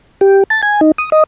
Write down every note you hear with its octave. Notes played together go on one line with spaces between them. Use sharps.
G4
A5
G#5
D#4
D#6
D#5